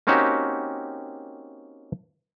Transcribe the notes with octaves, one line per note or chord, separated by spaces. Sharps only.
A#3 C4 C#4 D#4 F#4 G4